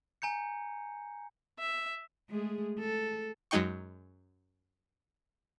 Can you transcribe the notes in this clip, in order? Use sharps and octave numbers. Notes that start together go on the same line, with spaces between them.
G#5 A#5 G6 C#7
E5
G#3 A3 G#4
A4
F#2 F#3 G#3 D#4 G5 C#6